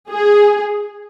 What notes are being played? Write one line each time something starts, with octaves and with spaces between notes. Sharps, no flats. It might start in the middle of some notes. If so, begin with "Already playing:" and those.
G#4